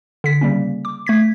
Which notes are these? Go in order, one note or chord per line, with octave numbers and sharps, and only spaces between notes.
D3 B6
C#3 G3 A#3 C#4
D6
A3 G#6 B6